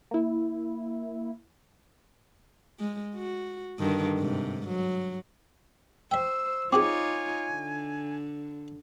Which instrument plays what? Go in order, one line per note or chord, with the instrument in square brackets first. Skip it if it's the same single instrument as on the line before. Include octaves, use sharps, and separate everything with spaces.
[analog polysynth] A#3 E4
[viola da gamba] G#3
F#4
G2 D3 D#3
G#2 C3
F#3
[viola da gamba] C5 [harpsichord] E5 G5 [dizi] E6
[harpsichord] C4 F#4 G#4 [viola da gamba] D#4 F4 C#5 [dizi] G#5 [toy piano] D6
[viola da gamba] D3